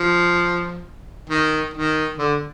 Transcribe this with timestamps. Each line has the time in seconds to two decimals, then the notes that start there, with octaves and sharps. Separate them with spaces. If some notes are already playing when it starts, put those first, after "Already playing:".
Already playing: F3
1.30 D#3
1.74 D#3
2.18 D3